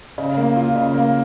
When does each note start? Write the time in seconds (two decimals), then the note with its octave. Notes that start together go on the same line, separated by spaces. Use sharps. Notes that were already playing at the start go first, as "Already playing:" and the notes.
0.18 C#3
0.37 A#3
0.56 F4
0.75 C#3
0.94 A#3